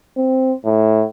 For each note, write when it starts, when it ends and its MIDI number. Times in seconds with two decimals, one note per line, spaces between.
0.17 0.54 60
0.65 1.05 45